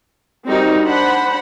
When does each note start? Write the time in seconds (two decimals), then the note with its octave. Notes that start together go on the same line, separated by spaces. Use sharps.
0.49 G3 C4 D#4 F#4 A#4
0.85 D4 C5 F#5 B5